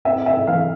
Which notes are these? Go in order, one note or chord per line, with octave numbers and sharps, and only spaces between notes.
C4 E5
E5
E3 F5